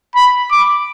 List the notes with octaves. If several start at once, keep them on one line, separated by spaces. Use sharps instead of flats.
B5
D6